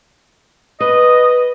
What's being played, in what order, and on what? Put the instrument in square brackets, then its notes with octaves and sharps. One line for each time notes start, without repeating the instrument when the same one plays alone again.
[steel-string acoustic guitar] B4 [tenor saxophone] D#5